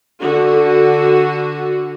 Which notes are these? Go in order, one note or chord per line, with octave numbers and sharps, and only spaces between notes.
D3 F#4